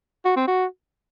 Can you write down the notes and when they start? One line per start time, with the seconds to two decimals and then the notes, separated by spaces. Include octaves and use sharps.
0.25 F#4
0.36 C4
0.48 F#4